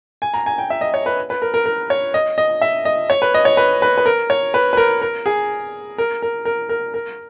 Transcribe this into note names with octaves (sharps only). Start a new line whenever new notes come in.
G#5
A#5
G#5
G5
E5
D#5
C#5
B4
B4
A#4
A#4
A#4
C#5
D#5
D#5
E5
D#5
C#5
B4
D#5
C#5
B4
B4
B4
A#4
C#5
B4
B4
A#4
A#4
G#4
A#4
A#4
A#4
A#4
A#4